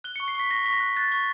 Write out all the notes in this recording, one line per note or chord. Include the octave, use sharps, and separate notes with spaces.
F#6 G7
C#6 C#7
C7
C#6 B6
C#6 A#6
C#6 B6
A#6
F#6
F#6 A6
C#6